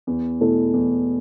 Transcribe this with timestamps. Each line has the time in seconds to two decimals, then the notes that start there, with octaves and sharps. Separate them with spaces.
0.07 E2
0.41 B2 A3 E4 A4
0.74 E2